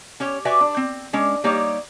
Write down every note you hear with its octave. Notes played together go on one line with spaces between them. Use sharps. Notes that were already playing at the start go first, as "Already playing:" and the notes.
C#4 G4 C#5
F#4 G4 B4 D5 E5 G#5
D4
C4
G#3 C#4 D4
G3 A#3 D#4 G4 C#5 D5